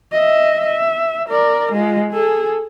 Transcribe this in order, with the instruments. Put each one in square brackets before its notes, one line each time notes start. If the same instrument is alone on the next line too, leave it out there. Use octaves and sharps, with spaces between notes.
[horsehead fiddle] D#5 E5
E5
A#4 D5
G#3 F4
G#4 A4